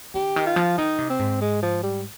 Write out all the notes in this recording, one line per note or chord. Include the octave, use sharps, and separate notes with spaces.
D3 G4
D#3
F4
F3
D#3 D#4
C3
C4
G#2
G#3
F3
G3